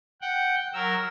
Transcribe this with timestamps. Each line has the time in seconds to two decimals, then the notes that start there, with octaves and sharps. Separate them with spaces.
0.21 F#5 G5
0.74 F#3 A#4 E6